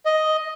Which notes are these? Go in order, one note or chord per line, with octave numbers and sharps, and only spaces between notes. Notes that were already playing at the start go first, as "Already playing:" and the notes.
D#5